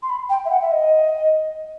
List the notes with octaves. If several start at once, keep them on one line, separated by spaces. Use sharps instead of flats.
C6
B5
G5
E5
F#5
E5
D#5